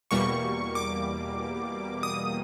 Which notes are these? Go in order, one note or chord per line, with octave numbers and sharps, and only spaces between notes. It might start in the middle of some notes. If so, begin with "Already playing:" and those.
E2 B2 G3 A#3 C#6
D6
D#6